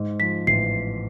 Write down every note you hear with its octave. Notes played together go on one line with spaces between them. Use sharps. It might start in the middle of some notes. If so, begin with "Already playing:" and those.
Already playing: G#2
F3 B6
A1 C7